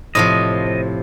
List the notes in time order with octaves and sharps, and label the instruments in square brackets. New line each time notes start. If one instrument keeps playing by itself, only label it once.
[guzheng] A2 C3 F3 [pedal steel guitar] D#5